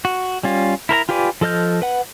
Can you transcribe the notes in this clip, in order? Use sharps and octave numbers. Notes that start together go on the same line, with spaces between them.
F#4
G3 C#4 F4
E4 A#4 C5 A#5
F4 G4 B4 D5 G#5
F3 A4 D#5 F6 G6
B4 F#5